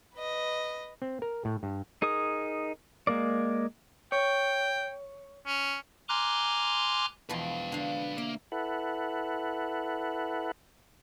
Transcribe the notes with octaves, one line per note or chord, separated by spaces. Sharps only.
B4 D#5
C4
A#4
A2
G2
D#4 G#4 A#4 D#6
G#3 A#3 A#4 D5
C#5 G5
C#4
G#5 A#5 C6 D6 F6 F#6
E2 B2 F3 B4 G5
D3 F5
A#3 E5
E4 A4 B4 F#5